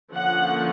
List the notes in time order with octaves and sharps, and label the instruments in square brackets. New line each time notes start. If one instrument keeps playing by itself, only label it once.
[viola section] D3 F3 A#3 C#4 F#5